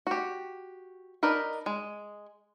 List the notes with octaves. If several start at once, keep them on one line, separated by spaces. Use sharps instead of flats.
F#4 G4
D4 D#4 A#4 B4
G#3